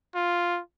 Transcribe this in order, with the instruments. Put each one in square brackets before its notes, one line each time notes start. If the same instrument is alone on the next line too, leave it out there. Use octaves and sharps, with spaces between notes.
[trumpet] F4